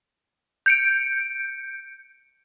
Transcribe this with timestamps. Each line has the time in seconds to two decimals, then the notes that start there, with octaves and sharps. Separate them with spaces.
0.66 G6 C#7 D7